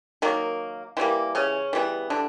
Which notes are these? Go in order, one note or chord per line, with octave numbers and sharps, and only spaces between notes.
D#3 F#3 A#3
E3 G3 A#3 C4
C#3 C#4
E3 G3 B3
D3 D4